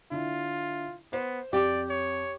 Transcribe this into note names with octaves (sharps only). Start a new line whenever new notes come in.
D3 E4 F4
B3 C5
F2 G4 D5
C#5